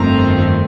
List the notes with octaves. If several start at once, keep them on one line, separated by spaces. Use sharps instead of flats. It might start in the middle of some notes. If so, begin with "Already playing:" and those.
Already playing: G1 F2 D#3 A3 C4 A#5